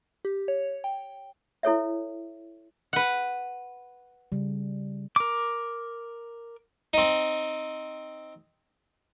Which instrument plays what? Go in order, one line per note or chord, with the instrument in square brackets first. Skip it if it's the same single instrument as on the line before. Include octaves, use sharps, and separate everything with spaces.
[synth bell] G4
C#5
G5
[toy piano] E4 A4 C#5 E5
[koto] B4 F#5
[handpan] C#3 G3
[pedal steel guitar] A#4 D6
[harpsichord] C4 D#4